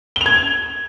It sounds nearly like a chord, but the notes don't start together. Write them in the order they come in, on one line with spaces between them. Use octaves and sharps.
G7 F7 G#6